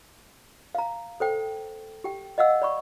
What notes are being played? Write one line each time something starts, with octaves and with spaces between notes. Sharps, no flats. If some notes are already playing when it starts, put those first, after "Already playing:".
F5 A#5
A4 C5 G5
G4 G5
D#5 F5 F#5 E6
D5 B5 C#6